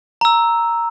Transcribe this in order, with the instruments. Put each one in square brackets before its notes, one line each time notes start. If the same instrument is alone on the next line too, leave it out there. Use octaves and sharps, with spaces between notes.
[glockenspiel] A#5 E6